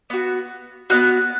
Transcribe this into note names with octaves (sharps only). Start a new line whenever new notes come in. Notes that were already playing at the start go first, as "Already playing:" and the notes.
B3 F#4
B3 D#4 F#4 F#6